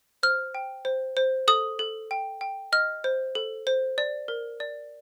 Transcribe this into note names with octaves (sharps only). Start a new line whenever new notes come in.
C5 F6
G5
C5
C5
A4 D#6
A4
G5
G5
D#5 F6
C5
A4
C5
D5
A#4
D5